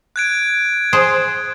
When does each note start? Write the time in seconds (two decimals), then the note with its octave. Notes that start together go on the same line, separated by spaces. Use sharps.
0.16 F#6 G#6 D7
0.93 G#4 C5